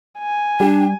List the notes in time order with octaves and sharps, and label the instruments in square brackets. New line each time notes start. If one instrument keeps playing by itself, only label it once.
[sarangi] G#5
[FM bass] G3 [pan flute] D4 [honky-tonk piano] G4